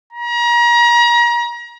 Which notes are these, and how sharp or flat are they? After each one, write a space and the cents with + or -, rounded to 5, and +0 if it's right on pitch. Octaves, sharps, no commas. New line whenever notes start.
A#5 +35